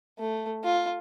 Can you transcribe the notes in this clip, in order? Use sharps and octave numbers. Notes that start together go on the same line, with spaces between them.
A3
F4